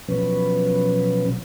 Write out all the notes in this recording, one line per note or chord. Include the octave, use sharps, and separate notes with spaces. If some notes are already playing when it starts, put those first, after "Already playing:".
B2 F3 F#3 C#4 B4